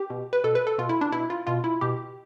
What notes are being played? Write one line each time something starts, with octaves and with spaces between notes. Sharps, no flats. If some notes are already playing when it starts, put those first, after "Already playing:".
Already playing: G4
B2
B4
B2 A4
B4
A4
B2 F4
E4
D4
B2 E4
F4
B2 F4
E4
B2 G4